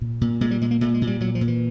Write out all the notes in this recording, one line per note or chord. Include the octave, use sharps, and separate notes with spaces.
A#2
A#2
A#2 G#3
G3
A#2 G#3
A#3
A#2 A3
G#3
A#2
G3
A#2 F#3
F3
A#2
E3